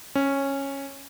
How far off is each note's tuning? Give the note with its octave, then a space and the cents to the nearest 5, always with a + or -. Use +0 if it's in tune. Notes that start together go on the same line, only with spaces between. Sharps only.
C#4 -10